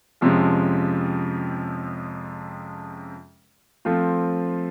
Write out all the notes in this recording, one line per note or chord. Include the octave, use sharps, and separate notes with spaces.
F2 C3 F3 G#3 C#4
F3 A3 C4 F4